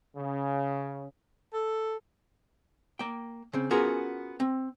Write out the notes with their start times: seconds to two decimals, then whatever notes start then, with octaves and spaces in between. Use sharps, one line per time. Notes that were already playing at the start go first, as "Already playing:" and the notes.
0.16 C#3
1.53 A4
2.99 A#3 G5
3.53 C#3 C4
3.71 B3 C#4 F4 F#4 G#4 A#4
4.40 C4